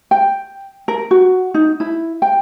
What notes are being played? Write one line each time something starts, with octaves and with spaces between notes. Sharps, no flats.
G5
A#4
F#4
D#4
E4
G5